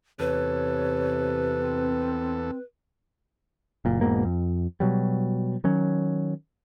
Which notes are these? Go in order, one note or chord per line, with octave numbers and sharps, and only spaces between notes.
E2 C3 A4 B4 C#5
C4
F#1 A#2
E1 G#2 B2 A#3
F2
B2 F#3 G3
D#3 F#3 C#4